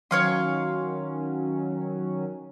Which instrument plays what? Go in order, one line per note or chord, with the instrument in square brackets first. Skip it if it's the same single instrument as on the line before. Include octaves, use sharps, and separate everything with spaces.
[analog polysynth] D#3 F#3 C#4 [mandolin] C#5 F5 C6